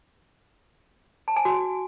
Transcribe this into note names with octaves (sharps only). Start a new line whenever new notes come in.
A5
G#5
F#4